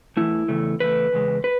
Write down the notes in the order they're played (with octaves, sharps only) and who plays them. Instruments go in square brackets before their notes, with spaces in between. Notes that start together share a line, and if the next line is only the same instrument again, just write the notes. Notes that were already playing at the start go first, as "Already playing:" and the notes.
[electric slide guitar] E2 C#3 E3 A3 E4
E2 C#3 A3
E2 C#3 A3 B4
E2 C#3 G#3
B4